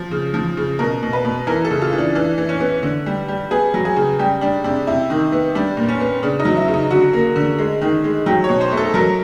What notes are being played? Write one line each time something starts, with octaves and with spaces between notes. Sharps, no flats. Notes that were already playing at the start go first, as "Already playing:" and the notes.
Already playing: F3
C#3
F3
C#3
B2 A#4
B2
B4
B2
E3 A#4
A4
C#3
F4
E3
D4
E3 D4
E3
C#4
B3
D3
G3
G3
B3 G#4
F#3
G#4
C#3
G3 G4
G3 D4
C3 D4
C3 E4
D#3
B3
G3 D4
A#2
C#4
B3
C#3 D4
D#4
F#3
E4
C#3
D#4
D3 F#4
A#3
D3
G#3
D#3
G#3
F#3 G4
C#5
B2
C5
A3
A4
F#3 A#4